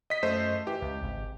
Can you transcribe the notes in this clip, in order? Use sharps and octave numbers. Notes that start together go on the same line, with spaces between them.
D#5 B6
F#2 A3 C5 D#5
E3 G4
C#2
G#1